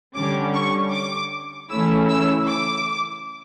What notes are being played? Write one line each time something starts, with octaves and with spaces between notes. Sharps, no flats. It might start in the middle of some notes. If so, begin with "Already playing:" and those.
D3 G3 C#4 D6
C#6
D6
C#3 E3 A3 C#4 E4 E6
E6
D6